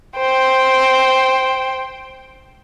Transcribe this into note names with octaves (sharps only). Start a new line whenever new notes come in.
C5 G5